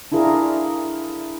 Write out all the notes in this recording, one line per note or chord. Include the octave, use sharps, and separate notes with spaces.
D4 E4 F4 G#4 A#4